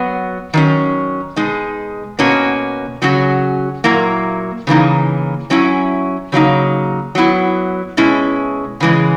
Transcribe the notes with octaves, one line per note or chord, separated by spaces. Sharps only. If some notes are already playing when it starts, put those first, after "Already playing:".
Already playing: F#3 B3 F#4
D#3 F#3 C#4
B2 G#3 D#4
B2 A#3 C#4 F#4
C#3 F#3 C#4 F#4
A#2 F#3 A#3 E4
C#3 E3 A#3 D#4
F#3 C#4 E4
C#3 F#3 A#3 D#4
F#3 B3 E4
B2 G#3 C#4 E4
C#3 E3 G#3